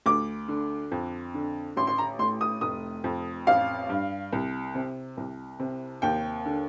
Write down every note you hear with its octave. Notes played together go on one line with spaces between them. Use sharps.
D2 D6
D3
F2
D3
A1 C6
C6
A#5
A2 C6
D#6
F1 D#6
F2
A1 F5
G2
C2
C3
C2
C3
D#2 G5
D3